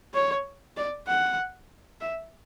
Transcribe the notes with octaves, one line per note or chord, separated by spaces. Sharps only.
C#5
D5
F#5
E5